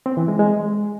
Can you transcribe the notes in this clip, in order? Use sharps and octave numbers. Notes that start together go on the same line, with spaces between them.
C4
E3
G#3
G#3